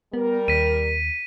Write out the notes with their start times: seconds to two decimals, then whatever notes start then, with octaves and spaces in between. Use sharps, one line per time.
0.14 G3 B3 A#4
0.48 D#2 B6 D#7